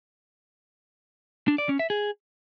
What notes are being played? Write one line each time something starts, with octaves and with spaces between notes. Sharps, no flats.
D4
D5
C#4
E5
G#4